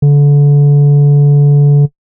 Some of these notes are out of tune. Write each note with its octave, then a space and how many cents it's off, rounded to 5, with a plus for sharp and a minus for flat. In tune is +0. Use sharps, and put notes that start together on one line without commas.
D3 -30